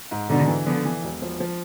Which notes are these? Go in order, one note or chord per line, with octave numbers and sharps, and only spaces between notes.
G#2
G#2 B2 D3
E3
D3 F3 B3
E3
E1
F3
F3